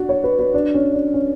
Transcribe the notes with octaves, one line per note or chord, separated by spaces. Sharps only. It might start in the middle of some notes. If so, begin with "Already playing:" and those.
Already playing: D4 F#4
C#5
B4
B4
D4
C#4
D4
C#4